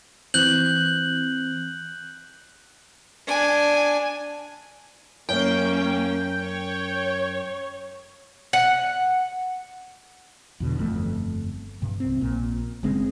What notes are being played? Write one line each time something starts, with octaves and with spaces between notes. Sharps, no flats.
E3 C4 F#6 G6 F#7
D4 G#5
F#2 A#3 C#4 G5
C#5
F#5
E2 B2 D3
G1 F2 A3
G2 C3
C2 C4
A#1 A#2
F#1 C#3 G#3 C4